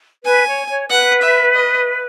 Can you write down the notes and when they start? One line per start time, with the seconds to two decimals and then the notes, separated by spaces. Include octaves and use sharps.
0.25 B4 G#5
0.47 C#5
0.68 C#5
0.89 B4 F#5
1.22 E5
1.54 D#5